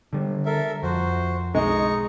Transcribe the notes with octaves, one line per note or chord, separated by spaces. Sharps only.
D3 G3
A4 A#4 E5
F2 F#4 C5
B1 G#3 D#4 A#5 C#6